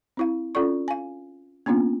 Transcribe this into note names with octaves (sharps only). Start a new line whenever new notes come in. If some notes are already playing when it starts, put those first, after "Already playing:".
C4 E4 F5
C#4 F4 A4 D5 C#6
F5 G#5
A#3 B3 C#4 D4 F4